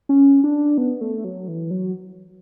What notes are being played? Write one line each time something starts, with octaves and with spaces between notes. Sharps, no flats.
C#4
D4
B3
A3
F#3
E3
F#3